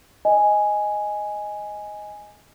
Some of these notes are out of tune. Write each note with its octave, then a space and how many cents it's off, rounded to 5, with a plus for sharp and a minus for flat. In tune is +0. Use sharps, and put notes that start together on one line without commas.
D#5 +0 G#5 +0